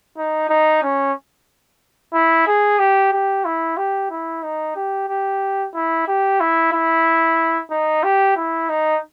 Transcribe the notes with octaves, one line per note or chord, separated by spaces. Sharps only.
D#4
D#4
C#4
E4
G#4
G4
G4
E4
G4
E4
D#4
G4
G4
E4
G4
E4
E4
D#4
G4
E4
D#4